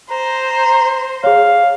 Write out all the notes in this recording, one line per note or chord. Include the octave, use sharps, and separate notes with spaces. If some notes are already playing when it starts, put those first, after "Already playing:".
C5 A#5
G#4 C#5 F5